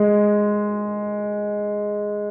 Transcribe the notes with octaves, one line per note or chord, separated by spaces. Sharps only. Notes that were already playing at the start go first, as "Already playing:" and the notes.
Already playing: G#3